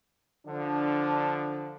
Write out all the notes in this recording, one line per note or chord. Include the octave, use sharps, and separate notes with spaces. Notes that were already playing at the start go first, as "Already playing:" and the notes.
D3 F3 D4